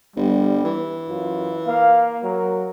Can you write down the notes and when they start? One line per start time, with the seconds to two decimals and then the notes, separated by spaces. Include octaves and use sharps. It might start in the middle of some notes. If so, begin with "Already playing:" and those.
0.16 G1 G3
0.65 E3
1.09 F#2 F4
1.67 A#3 F5
2.23 F#3 A#4